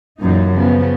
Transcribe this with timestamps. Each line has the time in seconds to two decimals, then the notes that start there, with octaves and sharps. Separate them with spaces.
0.19 F#2 A#2 E3 D#4
0.53 C#3 F3 B3